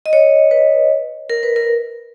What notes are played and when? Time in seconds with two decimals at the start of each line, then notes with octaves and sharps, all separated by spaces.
0.06 D#5
0.13 C#5
0.51 B4
1.30 A#4
1.43 B4
1.56 A#4